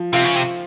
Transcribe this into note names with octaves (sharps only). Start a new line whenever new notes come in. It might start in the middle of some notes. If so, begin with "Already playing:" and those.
Already playing: F3
C3 F4
C#3
C3